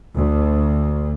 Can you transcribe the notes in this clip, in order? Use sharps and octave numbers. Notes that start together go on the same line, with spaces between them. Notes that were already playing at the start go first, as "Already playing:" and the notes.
D2